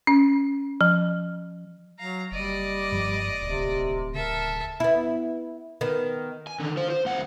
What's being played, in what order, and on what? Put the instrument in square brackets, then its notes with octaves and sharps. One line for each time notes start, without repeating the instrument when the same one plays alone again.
[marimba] C#4
F3
[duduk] F#3 [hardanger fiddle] F5 A#5
[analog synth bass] F#1 [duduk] G3 [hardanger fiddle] D5 D#5
[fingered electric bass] G2 F3
[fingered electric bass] D1 [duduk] C3
[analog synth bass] C#3 [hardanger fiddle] A4 E5 [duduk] A#4
[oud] B3 E4
D#3 B3
[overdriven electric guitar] G#5
D3 D#3
F4 C5
C5
C#2 F#5